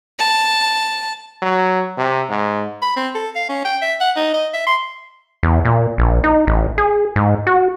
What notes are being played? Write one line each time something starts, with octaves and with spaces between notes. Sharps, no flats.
A5
F#3
C3
G#2
B5
C4
A4
F5
C#4
G5
E5
F#5
D#4
D#5
E5
C6
E2
A#2
A#1
D#4
A1
G#4
G#2
F#4